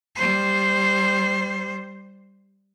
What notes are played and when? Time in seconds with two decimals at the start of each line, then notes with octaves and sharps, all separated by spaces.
0.16 G3 C5